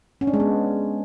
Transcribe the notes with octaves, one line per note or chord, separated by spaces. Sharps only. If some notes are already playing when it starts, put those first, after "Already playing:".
C#4
D4
G#3
B3